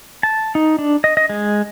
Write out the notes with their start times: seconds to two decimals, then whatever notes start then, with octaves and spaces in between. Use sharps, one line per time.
0.23 A5
0.55 D#4
0.79 D4
1.04 D#5
1.17 D#5
1.30 G#3